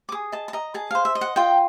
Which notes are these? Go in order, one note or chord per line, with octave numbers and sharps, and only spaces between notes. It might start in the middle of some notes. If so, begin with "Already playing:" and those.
D6
G#4 D#6
D#5 A5
A5
D#5 A#5
G#4 A5
C5 F5
E5
D#5
F#5
F4 G5